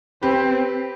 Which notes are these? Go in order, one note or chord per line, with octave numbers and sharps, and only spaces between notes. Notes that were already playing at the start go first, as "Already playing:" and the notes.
C4 G4 B4